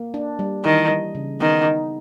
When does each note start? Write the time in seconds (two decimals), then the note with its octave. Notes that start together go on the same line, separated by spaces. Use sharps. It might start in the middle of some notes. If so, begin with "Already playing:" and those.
Already playing: A#3
0.14 D4
0.39 G3
0.65 D#3 E3
0.90 G3
1.15 C#3
1.41 D#3 B3
1.66 D#4